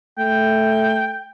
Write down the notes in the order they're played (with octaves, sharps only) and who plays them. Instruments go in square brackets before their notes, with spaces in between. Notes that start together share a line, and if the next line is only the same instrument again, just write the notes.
[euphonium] A3 [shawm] G5